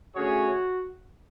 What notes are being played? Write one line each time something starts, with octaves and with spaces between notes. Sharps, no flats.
D3 A3 C#4 F#4 G#4 C#5